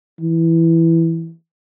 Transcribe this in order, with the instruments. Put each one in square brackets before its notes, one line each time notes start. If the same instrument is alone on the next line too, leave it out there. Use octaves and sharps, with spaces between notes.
[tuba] E3